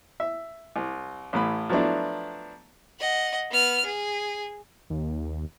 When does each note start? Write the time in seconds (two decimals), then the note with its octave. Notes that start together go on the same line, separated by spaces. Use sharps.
0.20 E5
0.76 C2
1.33 A1 A2 B5
1.69 F3 F#3 A3 B3 D4 E4
2.99 D#5 F#5
3.51 B3 F6
3.85 G#4
4.90 D#2